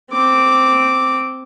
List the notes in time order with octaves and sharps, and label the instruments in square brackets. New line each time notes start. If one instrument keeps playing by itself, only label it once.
[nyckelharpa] C4 D6